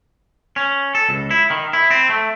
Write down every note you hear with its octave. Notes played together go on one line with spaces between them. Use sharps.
C#4
A4
C#2
E4
D#3
E4
C4
A3